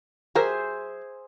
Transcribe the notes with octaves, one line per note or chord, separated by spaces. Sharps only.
F#3 G4 G#4 A#4 C5 E5